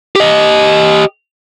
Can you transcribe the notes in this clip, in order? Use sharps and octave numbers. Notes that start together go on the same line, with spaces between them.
G4 D#5